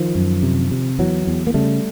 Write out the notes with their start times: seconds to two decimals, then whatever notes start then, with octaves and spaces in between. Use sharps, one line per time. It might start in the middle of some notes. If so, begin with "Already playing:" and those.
Already playing: D#3 F3
0.15 F#2
0.43 C3
0.71 C3
0.99 E2 E3 F#3
1.27 E2
1.47 A#3
1.54 C#3 G3 A3